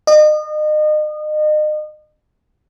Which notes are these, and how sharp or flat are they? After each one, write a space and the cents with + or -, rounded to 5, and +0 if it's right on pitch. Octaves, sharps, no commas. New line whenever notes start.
D#5 -35